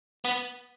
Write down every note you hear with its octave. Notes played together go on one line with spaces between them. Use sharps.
B3